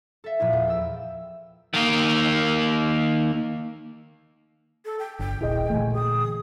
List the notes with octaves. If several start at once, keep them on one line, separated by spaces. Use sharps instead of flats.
A4 E5
A#2 F3 B3 E4
E2
G5 E6
D#3 A#3
A4
G5
G1 D3 G5
D#1 A#1 E4 G#4 D#5
A#2 D3 E3 A3 G#5
G#4 D#6